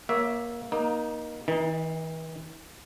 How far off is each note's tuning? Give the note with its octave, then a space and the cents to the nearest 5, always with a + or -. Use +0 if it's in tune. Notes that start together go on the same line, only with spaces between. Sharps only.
A#3 +20 C#5 +15 E5 +0
A#3 +25 D#4 +0
E3 -40 D#4 +10